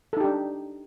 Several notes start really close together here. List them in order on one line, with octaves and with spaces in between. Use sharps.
A4 D#4 G4 D4